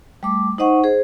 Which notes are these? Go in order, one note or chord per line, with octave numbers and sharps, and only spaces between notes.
G3 A3 D6
D#4 C5 D#5 F#5 C#6
G#4 C5